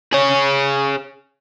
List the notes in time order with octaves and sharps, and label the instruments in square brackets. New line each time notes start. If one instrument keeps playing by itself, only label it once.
[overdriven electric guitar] G#4 C#5